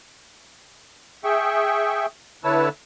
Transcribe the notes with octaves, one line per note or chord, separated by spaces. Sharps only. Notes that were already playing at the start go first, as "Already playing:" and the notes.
G#4 E5 G5 C#6
D3 E4 B4 C#5 A5 E6